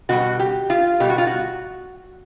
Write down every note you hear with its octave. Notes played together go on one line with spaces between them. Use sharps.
B2 G3 F#4
G4
F4
B2 G3 G4
F#4
F4
F#4